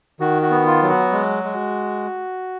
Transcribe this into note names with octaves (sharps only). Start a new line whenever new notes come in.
D#3 F#4
F#4
B3
F4
F#3
F#4
G#3
G#3